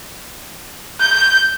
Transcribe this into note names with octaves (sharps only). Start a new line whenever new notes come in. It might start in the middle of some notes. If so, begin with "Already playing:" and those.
G6